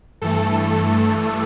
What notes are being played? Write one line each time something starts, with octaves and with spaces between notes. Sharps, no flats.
G2 E3 A3 A4
A4